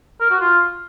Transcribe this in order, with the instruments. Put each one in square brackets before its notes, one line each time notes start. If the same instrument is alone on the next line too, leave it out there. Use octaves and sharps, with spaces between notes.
[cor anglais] A#4
F#4
F4